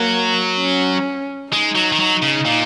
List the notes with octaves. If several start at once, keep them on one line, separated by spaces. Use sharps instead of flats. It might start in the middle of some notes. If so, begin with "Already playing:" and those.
Already playing: F#3 A#3
C#4
G#3 D#4
F#3
D#3
F#3
C#3
A#2